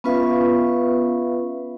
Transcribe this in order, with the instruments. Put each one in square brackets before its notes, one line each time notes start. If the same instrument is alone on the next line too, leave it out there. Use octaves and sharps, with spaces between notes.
[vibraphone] B3 C#4 F4 B4 E5 F5